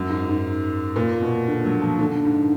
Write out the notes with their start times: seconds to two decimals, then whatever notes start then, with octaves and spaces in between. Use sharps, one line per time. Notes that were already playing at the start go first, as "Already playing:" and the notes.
Already playing: F#2
0.10 G#2
0.27 G#2
0.96 A#2
1.22 B2
1.48 D3
1.65 F#3
1.81 F3
1.99 D3
2.25 G#2